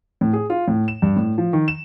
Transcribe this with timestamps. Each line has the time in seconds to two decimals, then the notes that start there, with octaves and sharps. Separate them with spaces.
0.21 A2
0.33 G#4
0.50 F4
0.68 A2
0.88 E7
1.02 G2
1.16 A2
1.38 F3
1.53 D#3
1.68 E7